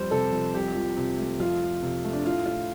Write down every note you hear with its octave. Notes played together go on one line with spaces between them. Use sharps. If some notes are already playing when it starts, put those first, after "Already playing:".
Already playing: F2 G3 C5
C3 A4
F2
C2 G4
F3
C3
A3
F2 F4
F3
C3
A3
D4
A2 F4
A2 F4